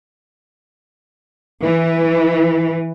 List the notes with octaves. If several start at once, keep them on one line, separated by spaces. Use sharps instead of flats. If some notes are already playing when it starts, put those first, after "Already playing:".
E3